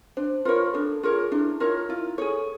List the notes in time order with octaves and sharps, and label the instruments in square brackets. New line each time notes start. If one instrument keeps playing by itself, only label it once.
[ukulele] D4 [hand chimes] C5
[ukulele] F4 A#4 C#5 [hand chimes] B4
[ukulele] D4 [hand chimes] A4
[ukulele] F4 A#4 C#5 [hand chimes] G#4
[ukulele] D4 [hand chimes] E4
[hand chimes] D#4 [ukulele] F4 A#4 C#5
[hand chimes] E4 [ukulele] F4
[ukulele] G#4 C#5 [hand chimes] A4